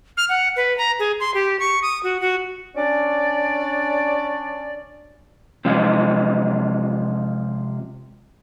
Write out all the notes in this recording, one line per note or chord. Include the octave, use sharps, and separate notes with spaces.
F6
F#5
B4
A#5
G#4
C6
G4
C#6
D#6
F#4
F#4
C#4 D4 D5
C3 F3 G#3